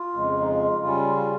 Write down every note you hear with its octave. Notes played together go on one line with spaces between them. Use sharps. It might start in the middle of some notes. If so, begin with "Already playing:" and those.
Already playing: F4
F2 C#3 G#3
D#4
F4
C#3 G3 C#4 F4
F4